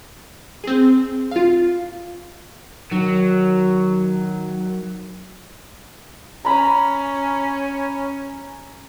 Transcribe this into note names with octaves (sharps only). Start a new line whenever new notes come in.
C4 G#4
F4 F5
D#3 F#3
C#4 A#5 B5